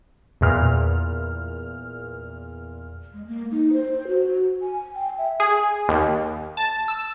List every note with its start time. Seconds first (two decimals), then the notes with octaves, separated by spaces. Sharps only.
0.41 E2 A#2 F6
3.13 G#3
3.27 A#3
3.51 D#4
3.73 C5
4.07 F#4
4.62 G#5
4.95 G5
5.18 E5
5.40 G#4
5.88 D#2
6.57 A5
6.88 E6